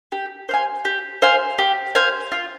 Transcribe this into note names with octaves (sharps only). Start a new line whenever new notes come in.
G4
C5 F5 G#5
G4
C5 F5 G#5
G4
C5 F5 G#5
F4